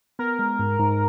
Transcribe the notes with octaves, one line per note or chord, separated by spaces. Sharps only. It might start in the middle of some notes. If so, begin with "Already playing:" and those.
B3 A#4
G#3
G#2
G#2